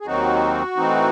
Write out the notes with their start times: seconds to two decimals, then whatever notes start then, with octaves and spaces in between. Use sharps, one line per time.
0.01 G#4
0.06 D#2 D#3 F#3 C4 D#4 F#4
0.77 A2 E3 C4 D#4